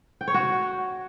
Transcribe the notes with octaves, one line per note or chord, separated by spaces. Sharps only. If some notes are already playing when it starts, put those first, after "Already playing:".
G5
C#5
F#4